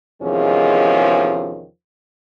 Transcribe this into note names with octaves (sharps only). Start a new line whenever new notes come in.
E2 C3 D#3 F3 G#3 C#4